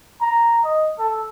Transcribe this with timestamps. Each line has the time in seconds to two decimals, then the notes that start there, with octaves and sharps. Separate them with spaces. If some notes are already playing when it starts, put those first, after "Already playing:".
0.21 A#5
0.64 D#5
0.99 A4